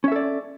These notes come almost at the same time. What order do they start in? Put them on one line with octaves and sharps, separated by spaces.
C#4 E5 A4 D5